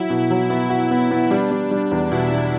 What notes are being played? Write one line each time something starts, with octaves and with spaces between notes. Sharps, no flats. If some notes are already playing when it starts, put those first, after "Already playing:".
Already playing: F#3 E4 F#4
B2
F#3
B3 E4
F#4
B3
B3
G3 D4
G3
G3
E2
B2 E4
B2